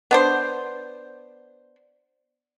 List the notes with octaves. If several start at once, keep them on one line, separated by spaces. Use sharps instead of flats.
B3 D4 C5